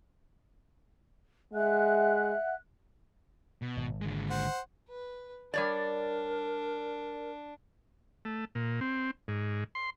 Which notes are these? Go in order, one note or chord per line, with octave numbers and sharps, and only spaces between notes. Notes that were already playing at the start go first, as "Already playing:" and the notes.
G#3 E5 F#5 F#6
B2
G#1
D3 G#3
C5 F#5
B4
G3 D4 A#4 C#5 D5
A3
A#2
C4
G#2
C6